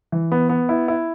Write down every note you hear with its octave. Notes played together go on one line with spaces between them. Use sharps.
E3
B3
B3
E4
E4